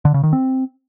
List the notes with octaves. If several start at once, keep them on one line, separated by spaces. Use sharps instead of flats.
D3
C#3
D#3
C4